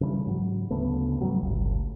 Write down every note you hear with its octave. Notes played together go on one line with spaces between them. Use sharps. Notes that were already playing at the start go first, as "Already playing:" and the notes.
C#3 E3 F#3 G3
G#2 F#3
D2 C#3 A3 B3
G#2 C#3 F#3 G3
G1 C#2 A2